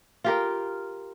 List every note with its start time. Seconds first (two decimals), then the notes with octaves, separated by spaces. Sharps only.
0.24 F4 G4 A#4